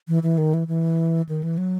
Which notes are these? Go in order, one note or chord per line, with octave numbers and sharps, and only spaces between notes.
E3
E3
D#3
E3
E3
D#3
E3
F#3